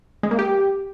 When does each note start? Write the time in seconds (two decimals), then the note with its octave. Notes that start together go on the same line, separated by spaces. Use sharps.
0.23 G#3
0.31 A#3
0.39 G4